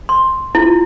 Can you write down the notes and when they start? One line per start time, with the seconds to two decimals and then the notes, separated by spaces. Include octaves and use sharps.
0.09 C6
0.55 E4 F4